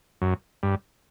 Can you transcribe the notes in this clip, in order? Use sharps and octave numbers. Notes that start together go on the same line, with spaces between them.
F#2
G2